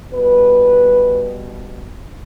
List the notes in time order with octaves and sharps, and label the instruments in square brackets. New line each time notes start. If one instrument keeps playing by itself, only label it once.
[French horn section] B2 G3 B4